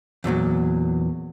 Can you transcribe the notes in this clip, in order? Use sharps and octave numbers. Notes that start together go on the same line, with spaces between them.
E2 A#2 F3 F#3